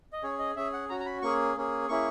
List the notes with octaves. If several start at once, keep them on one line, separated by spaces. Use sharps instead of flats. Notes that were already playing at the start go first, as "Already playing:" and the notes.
D#5
C#4 G#4 C#5
D#5
C#4 G#4 E5
F#5
C#4 F#4 A#5
A#5
B5
A#3 C#4 G#4 C#6
A#3 C#4 G#4
A#3 C#4 E4 G#4 C#6